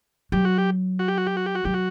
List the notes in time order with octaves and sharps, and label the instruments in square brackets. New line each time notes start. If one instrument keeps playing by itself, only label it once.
[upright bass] F#3 [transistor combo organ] G4
[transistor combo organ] F#4
G4
F#4
G4
F#4
G4
F#4
G4
F#4
[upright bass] F#3 [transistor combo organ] G4
[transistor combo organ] F#4